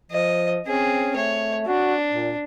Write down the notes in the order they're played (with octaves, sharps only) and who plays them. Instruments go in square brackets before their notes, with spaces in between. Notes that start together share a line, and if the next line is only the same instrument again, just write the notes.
[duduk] F3 [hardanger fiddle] D#5
[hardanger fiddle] C4 G#4 [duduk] C#4
[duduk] A3 [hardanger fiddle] C#5
[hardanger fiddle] D4 [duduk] F#4
[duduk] A#2